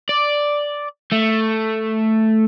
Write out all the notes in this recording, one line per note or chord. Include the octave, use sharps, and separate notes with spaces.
D5
A3